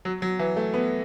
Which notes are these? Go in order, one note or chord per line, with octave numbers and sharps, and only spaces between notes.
F#3
F#3
E3
A3
B3